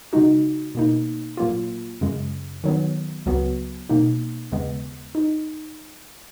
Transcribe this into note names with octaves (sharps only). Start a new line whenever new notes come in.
C#3 G#3 D#4 F#4
B2 A#3 D#4
A#2 F#3 A#3 F4
F#2 C#3 G#3
D#3 F#3 B3
C#2 C#3 F#3 B3 F#4
B2 A#3 D#4
D#2 C#3 G#3 B3
D#4